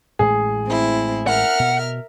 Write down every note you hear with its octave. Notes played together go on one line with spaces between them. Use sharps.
A1 A2 G#3 G#4
C4 E4
A#4 E5 F#5 F6
B2